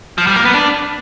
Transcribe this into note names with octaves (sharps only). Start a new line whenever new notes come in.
F3
G3
A#3
B3
D4